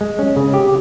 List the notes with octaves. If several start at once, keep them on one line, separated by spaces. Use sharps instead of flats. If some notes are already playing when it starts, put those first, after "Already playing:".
G#3
C#4
C#3
G4